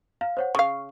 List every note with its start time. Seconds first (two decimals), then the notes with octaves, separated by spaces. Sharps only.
0.21 F5
0.37 C5 C#5 F#5
0.55 C#3 F5 C#6